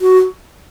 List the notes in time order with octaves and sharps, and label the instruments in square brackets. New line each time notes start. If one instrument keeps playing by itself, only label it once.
[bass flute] F#4